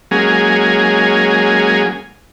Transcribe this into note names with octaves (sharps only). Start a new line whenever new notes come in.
F#3 G#3 A#3 C#4 G#4